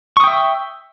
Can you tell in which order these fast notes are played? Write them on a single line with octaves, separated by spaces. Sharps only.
C#6 D#6 G5 E5